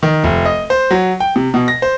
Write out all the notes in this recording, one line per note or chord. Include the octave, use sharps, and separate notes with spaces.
D#3
F1
D#5
C5
F#3
G5
C3
B2
A#6
C5